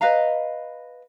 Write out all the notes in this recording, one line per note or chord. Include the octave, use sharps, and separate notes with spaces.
B4 D#5 F5 A#5